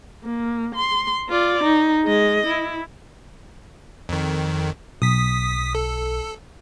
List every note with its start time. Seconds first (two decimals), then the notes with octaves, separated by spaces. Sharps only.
0.24 A#3
0.75 C6
1.29 F4 D5
1.64 D#4
2.06 G#3 D#5
2.46 E4
4.09 F2 D#3
5.02 B1 D#6 B6
5.75 A4